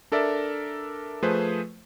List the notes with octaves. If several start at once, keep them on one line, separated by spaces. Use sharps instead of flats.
D4 A4 A#4 D5 E5
F3 A3 G#4 B4 C5